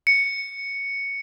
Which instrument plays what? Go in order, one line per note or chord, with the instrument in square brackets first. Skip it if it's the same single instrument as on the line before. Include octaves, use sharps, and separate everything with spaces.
[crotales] C#7